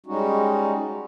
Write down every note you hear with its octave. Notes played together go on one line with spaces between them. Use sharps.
G3 G#3 C#4 D#4 F#4